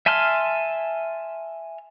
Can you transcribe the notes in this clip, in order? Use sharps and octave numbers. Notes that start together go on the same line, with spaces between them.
E5 G#5 A5 C6 F6